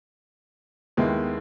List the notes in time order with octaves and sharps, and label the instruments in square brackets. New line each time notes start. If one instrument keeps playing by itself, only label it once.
[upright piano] D#2 D#3 G#3 B3 E4